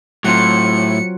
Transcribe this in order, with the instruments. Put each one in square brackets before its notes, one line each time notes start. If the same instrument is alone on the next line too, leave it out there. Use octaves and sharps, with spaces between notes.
[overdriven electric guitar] A2 [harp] F#3 C4 F4 [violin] C#7